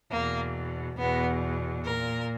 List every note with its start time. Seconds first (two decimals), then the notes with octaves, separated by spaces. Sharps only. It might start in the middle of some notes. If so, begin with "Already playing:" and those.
0.11 E2 B2 A#3
0.97 E2 B2 B3
1.84 A#2 A#4